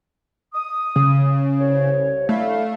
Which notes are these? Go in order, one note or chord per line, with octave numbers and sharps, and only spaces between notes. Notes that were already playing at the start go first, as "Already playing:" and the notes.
D#6
C#3
C2 C#5
A3 D4 E4 F5